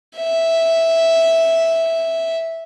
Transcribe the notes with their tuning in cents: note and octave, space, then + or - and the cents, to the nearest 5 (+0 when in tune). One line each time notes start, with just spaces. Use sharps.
E5 -5